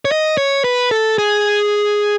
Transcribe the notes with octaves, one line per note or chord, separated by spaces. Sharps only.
C#5
D#5
C#5
B4
A4
G#4